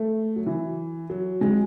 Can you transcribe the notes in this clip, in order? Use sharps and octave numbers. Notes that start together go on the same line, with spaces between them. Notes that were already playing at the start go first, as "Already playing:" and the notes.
Already playing: A3
F#3
E3
F#3
G#3